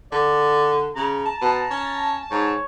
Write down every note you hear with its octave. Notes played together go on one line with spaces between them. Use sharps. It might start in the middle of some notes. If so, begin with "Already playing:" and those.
D3 D5
C#3 A#5
A5
B2
C#4 A5
G#2 C#5